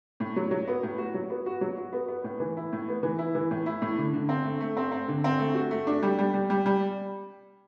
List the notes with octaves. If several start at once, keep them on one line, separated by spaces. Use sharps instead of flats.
A2
F#3
F#3
B3
A2
F#4
F#3
B3
F#4
F#3
F#4
B3
B3
A2
E3
E4
A2
B3
E3
E4
E3
A2
E4
A2
D3
D3
C4
A3
A3
C4
C4
D3
C4
A3
F#4
A3
D4
G3
G3
G3
G3
G3